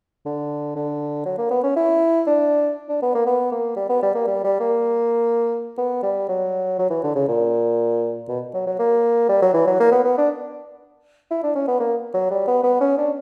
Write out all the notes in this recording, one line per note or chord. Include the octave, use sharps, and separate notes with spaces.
D3
D3
F#3
A#3
B3
C#4
E4
D4
D4
B3
A#3
B3
A#3
G3
B3
G3
A#3
G3
G3
A#3
B3
G3
F#3
F#3
E3
D3
C#3
A#2
B2
F#3
F#3
A#3
G3
F#3
E3
F#3
A#3
B3
B3
D4
E4
D4
C#4
B3
A#3
F#3
G3
B3
B3
C#4
D4